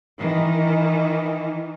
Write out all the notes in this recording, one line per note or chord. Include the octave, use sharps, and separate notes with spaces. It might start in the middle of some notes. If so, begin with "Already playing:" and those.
D#3 E3